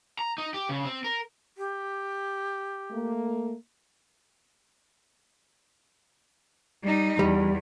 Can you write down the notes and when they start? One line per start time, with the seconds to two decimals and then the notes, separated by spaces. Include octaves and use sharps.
0.19 A#5
0.38 D#4
0.54 G4
0.69 C#3
0.85 C4
1.04 A#4
1.58 G4
2.90 A3 A#3
6.83 G3 D#4
7.19 E2 G3